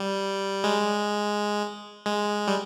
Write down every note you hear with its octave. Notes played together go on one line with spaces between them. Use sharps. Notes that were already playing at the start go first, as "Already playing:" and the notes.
Already playing: G3
G#3
G#3
G3